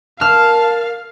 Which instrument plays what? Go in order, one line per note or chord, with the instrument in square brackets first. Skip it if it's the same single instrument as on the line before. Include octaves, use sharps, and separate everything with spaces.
[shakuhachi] A#4 [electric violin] F5 [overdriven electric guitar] A5 [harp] F6